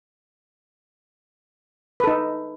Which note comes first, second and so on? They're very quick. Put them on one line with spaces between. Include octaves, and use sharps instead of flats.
B4 A4 D#4